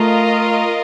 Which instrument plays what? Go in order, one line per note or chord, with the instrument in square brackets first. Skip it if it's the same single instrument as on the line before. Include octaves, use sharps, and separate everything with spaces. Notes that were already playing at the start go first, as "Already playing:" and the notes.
Already playing: [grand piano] A3 [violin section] F4 A#4 D#5